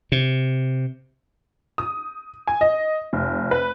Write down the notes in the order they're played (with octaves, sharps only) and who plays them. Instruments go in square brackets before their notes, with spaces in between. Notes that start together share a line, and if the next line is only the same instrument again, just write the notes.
[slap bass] C3
[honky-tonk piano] D#6
G#5
D#5
F1
B4